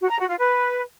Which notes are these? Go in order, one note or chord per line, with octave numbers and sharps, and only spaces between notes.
F#4
A#5
F#4
F4
B4